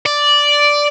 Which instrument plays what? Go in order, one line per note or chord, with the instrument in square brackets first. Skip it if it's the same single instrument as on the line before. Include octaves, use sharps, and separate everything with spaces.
[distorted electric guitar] D5